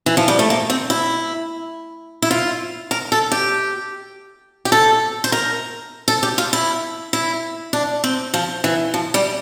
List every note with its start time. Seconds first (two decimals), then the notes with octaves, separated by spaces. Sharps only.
0.06 E3
0.17 F3
0.28 G3
0.39 A3
0.50 A#3
0.70 C4
0.90 E4
2.22 E4
2.31 F4
2.91 A#4
3.12 A4
3.32 G4
4.65 G4
4.72 A4
5.24 C5
5.32 A#4
6.08 A4
6.23 G4
6.38 F4
6.53 E4
7.13 E4
7.73 D4
8.04 C4
8.34 F3
8.64 E3
8.94 F3
9.14 G3